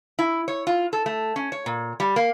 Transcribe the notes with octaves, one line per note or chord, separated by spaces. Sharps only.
E4
C#5
F4
A4
A3
C#4
C#5
A#2
G3
A#3